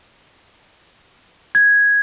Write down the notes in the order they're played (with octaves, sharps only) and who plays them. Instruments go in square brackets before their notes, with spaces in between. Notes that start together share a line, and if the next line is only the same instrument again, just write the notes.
[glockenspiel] G#6